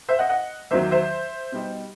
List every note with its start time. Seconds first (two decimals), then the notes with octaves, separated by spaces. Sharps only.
0.09 C5 E5
0.19 D#5 F#5
0.29 D#5 F#5
0.71 E2 D#3 F#3 C5 E5
0.91 C5 E5
1.52 B2 G3 D#4